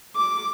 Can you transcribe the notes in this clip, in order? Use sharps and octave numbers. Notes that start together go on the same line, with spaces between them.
D6